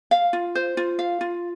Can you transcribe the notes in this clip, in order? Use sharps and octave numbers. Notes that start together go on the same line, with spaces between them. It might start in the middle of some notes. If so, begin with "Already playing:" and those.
F5
F4
C5
F4
F5
F4